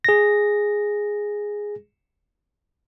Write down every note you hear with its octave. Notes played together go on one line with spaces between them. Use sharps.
G#4 A#6